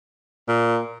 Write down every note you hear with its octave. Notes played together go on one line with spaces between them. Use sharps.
A#2